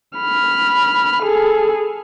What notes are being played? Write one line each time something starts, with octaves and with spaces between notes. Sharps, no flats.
B5 F6
G#4 A4